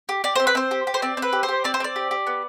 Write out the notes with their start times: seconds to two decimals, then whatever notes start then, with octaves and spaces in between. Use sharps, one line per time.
0.09 G4
0.24 G4 D5
0.36 C4 C5
0.47 B4
0.55 C4 C5
0.71 G4
0.87 G4
0.94 C5
1.02 C4 D5
1.17 C4
1.22 B4
1.33 G4
1.43 C5
1.48 G4
1.64 C4 D5
1.74 C5
1.80 C4 D5
1.96 G4
2.11 G4
2.27 B3